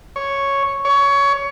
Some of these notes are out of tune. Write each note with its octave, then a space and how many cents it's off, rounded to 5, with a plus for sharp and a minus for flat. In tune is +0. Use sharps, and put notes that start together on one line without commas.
C#5 +0
C#5 +20